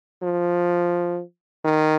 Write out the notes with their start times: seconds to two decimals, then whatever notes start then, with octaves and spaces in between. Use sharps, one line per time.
0.23 F3
1.64 D#3